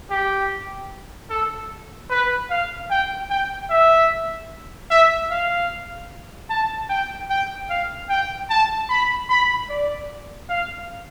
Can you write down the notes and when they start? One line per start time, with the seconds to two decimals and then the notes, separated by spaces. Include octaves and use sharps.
0.10 G4
1.30 A4
2.10 B4
2.50 F5
2.90 G5
3.30 G5
3.70 E5
4.90 E5
5.31 F5
6.50 A5
6.90 G5
7.30 G5
7.70 F5
8.09 G5
8.50 A5
8.89 B5
9.30 B5
9.69 D5
10.49 F5